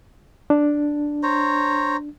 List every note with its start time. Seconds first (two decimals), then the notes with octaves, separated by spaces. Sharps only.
0.50 D4
1.23 C5 C#5 A#5